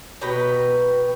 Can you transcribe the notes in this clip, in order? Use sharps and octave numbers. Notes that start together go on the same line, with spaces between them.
B2 B4 G5 A#5